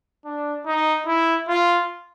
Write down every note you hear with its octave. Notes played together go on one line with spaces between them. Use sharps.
D4
D#4
E4
F4